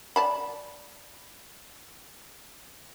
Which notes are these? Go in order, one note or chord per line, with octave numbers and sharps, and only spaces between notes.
D5 A5 B5